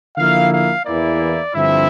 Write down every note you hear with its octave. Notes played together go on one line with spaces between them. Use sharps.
D3 F3 A#3 E4 F5
F5
E2 E3 A#3 E4 D5
G2 D3 F3 C4 E4 E5